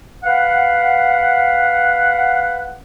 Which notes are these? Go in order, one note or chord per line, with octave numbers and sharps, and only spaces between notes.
B4 F5 F#5